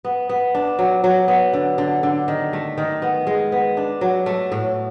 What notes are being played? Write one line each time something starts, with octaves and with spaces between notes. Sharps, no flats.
B3
B3
D4
F#3
F#3
B3
D3
D3
D3
D#3
A3
D#3
B3
G#3
B3
D4
F#3
A3
A2